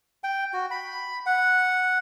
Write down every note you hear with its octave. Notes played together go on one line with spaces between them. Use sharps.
G5
F#4
B5
F#5